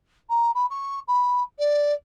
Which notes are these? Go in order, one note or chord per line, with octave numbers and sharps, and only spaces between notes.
A#5
B5
C#6
B5
D5